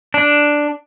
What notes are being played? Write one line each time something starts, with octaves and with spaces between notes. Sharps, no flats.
D4